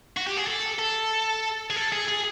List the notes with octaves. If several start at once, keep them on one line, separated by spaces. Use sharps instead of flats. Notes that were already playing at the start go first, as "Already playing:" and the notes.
F#4
G4
G#4
A4
A4
G#4
A4
G#4
G#4